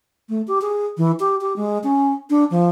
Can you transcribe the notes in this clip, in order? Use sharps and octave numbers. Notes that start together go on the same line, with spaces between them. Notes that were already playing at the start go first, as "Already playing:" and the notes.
A3
G4
G#4
E3
G4
G4
G#3
C#4
D4
F3